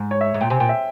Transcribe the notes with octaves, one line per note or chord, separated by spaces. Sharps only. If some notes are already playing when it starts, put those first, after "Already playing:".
Already playing: G#2
C#5
E5
G#2
A#2 G5
C3 G#5
A#2 G5
E5